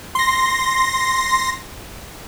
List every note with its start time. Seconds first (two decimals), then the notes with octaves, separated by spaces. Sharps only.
0.15 C6 A#6